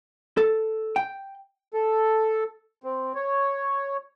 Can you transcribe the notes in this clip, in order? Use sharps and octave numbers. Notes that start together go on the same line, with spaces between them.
A4
G5
A4
C4
C#5